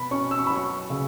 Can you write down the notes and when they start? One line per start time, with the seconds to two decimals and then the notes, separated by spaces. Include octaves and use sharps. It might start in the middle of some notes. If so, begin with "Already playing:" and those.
Already playing: B2 B5
0.11 C#4 C#6
0.31 E6
0.39 C#6
0.47 B5
0.50 F#3
0.56 C#6
0.90 C#3